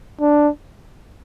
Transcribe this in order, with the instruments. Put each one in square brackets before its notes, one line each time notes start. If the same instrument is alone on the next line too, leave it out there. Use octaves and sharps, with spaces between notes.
[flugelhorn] D4